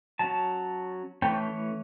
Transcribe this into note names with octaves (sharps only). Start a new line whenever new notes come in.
F#3 C#4 A5
E3 A3 C#4 G5